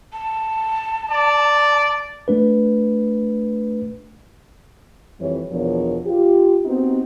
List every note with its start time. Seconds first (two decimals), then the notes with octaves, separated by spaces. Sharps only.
0.13 A5
1.11 D5
2.28 A3 D4 B4
5.20 F2 E3 G3 G4 C#5
5.51 E2 B2 F3 D4 A#4 C#5
6.06 F4 G4
6.65 B3 C4 D#4 F#4 G4